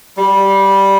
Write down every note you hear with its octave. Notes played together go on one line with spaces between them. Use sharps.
G3